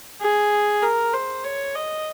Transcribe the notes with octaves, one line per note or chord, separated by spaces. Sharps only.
G#4
A#4
C5
C#5
D#5